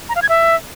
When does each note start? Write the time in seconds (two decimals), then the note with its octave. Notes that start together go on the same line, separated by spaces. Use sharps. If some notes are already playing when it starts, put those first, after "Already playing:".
0.09 A#5
0.16 F5
0.22 G#6
0.29 E5